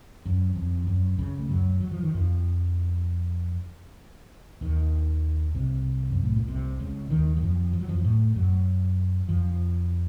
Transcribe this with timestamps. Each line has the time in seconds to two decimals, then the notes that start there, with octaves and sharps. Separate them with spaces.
0.26 F#2
0.56 F2
0.87 F#2
1.18 C#2 C#3
1.39 A3
1.49 F#2 F#3
1.80 F#3
1.92 F3
2.03 D#3
2.15 F2 F3
4.61 D#2 D#3
5.55 C2 C3
6.10 F#2
6.24 A2
6.36 A#2
6.48 C2 C3
6.80 C#2 C#3
7.10 D#2 D#3
7.37 F#3
7.42 F2 F3
7.73 F3
7.81 F#3
7.88 F2 F3
7.98 F#3
8.04 A2 A3
8.36 F#2 F#3
9.29 F2 F3